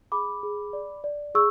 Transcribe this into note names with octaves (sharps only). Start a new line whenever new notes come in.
G#4 B5 D6
G#4
D5
D5
G#4 C#6 E6